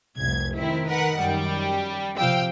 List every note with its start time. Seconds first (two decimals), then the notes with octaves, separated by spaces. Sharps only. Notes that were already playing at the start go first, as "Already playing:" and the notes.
0.18 F1 C2 G#6
0.57 D#3 C4 E4
0.88 A#4 B4 F#5
1.19 F#2 G3
2.17 C3 F3 F5 G5 E6